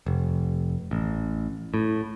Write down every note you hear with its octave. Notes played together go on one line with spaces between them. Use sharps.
F1
A1
A2